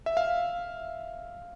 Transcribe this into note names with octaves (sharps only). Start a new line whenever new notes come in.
E5
F5